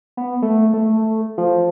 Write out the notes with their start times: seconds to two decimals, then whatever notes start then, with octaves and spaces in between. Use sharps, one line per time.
0.17 B3
0.42 A3
0.74 A3
1.38 F3